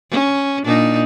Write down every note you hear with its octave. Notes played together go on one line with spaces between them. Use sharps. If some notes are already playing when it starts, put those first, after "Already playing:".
C#4
A#2 D4 D#4